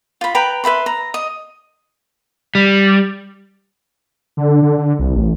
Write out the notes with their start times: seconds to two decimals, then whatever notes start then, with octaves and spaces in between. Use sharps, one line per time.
0.21 F4 B5
0.35 B4 G5 A#5 B5
0.64 B4 E5 B5 C6
0.86 A#5
1.14 D#5
2.55 G3
4.37 D3
4.62 D3
4.78 D3
4.99 C2
5.15 A1